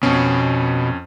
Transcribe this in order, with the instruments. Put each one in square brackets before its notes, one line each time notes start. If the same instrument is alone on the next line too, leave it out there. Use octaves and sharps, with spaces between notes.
[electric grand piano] F2 C#4 [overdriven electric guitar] B2